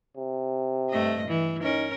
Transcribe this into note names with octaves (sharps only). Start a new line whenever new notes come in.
C3
G2 A3 D#5
E3
C#4 D#4 A#4